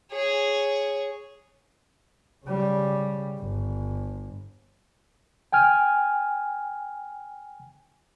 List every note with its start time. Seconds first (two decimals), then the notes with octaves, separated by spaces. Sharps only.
0.12 G#4 C#5
2.46 C#3 G3
3.40 G1
5.52 G5 G#5 F6